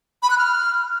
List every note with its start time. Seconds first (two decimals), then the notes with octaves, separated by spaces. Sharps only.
0.23 B5
0.30 F#6
0.38 F6